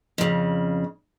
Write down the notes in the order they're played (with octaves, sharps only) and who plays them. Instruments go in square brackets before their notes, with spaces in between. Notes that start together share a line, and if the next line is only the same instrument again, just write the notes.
[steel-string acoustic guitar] F2 C#3